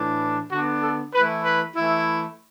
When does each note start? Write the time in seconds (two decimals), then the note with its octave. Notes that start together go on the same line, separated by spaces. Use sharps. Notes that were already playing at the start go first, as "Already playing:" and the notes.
Already playing: A2 E3 D4
0.51 D3 B3 D4 F#4
0.83 A4
1.14 E3 A3 E4 B4
1.44 B4
1.75 E3 A3 E4